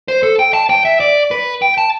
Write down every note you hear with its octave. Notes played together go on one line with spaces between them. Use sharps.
C5
A4
G5
A5
G5
E5
D5
B4
G5
A5